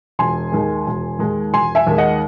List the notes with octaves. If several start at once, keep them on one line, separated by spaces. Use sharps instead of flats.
E1 G#5 C6
D#2 D#3 G#3
E1
D#2 D#3 G#3
E1 G#5 C6
E5 G#5
D#2 D#3 G#3
D#5 F#5